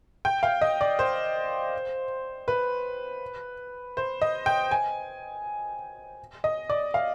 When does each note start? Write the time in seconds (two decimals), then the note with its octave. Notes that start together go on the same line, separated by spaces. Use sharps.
0.25 G5
0.43 F5
0.61 D#5
0.81 D5
0.99 C5
2.48 B4
3.97 C5
4.22 D#5
4.46 G5
4.71 G#5
6.44 D#5
6.70 D5
6.94 F5